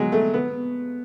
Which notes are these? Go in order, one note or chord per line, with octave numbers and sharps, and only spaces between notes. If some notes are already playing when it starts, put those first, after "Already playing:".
Already playing: F#3 G#3
A3
B3